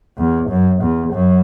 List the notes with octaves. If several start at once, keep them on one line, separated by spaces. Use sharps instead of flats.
E2
F#2
E2
F#2